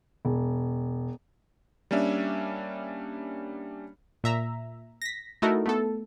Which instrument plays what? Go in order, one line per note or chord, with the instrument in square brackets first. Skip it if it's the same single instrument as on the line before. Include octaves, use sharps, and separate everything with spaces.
[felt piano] E1
[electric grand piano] G3 A#3 C#4 D4 E5
[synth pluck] A#2 E5 A#5
A#6 B6
A3 D#4 E4 F#4 A4 A#4
A3 B3 A4